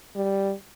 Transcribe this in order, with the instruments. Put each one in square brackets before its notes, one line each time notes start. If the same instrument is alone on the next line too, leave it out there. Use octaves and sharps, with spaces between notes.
[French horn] G3